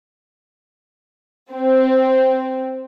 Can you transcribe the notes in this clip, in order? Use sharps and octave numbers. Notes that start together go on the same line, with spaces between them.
C4